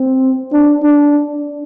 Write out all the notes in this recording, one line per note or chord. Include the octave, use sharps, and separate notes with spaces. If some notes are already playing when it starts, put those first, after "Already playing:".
Already playing: C4
D4
D4